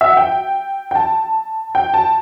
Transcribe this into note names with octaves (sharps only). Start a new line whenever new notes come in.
E5
F#5
G5
G5
A5
G5
A5